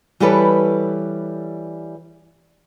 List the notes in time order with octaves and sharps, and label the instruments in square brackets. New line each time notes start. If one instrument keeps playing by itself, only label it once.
[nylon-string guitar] E3 G3 G4 A4 B4 C#5